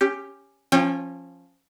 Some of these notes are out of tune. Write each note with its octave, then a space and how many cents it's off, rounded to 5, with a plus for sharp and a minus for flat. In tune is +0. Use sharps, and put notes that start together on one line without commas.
C#4 +0 G4 +10
F3 +0 C#4 -20 G5 +30